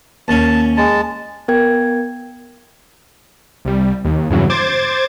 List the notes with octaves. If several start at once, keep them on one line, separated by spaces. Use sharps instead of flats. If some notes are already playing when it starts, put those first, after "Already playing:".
D#2 C#4 A5
G#3 A5
B3 A#4 G5 G#6
C2 G3
D#2
E2 G2 C#3 E3 F#3
C5 D6 G#6 A6